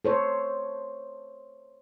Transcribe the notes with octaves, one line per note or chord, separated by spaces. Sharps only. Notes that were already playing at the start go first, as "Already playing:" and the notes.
A4 C5 C#5